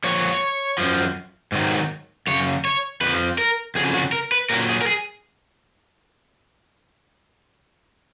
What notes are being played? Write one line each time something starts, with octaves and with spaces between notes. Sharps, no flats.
A#2 F3 C#5
F#2 F3
G#2 D#3 F#3
F#2 C#3 C#5
C#5
F2 F3 B4
A#4
F2 C#3 F#3 G#4
F#4
A#4
B4
A#2 F#3 A#4
G#4
A#4
G#4